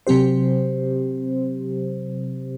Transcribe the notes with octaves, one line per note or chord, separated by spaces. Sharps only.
C3 F#3 C4 G4 C5